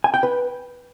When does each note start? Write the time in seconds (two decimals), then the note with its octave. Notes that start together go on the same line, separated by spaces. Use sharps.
0.04 G#5
0.14 G5
0.23 B4